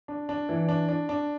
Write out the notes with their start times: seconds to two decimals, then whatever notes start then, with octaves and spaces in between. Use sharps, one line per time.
0.08 D4
0.29 D4
0.49 E3
0.69 D4
0.89 D4
1.09 D4